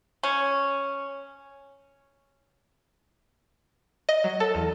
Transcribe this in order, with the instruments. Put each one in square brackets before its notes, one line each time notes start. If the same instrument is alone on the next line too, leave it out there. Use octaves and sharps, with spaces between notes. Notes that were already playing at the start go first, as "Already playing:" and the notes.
[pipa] C#4
[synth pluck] D#5
F#3
A4
E2